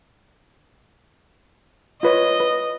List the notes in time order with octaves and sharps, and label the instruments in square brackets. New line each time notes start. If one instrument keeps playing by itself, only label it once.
[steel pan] F4 B4 C#5 [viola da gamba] D#5
[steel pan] B4